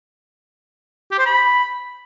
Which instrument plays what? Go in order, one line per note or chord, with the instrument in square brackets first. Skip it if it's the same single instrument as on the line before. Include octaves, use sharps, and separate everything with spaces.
[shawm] G4
C5
B5